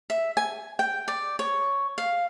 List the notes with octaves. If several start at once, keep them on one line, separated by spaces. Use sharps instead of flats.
E5
G#5
G5
D5
C#5
F5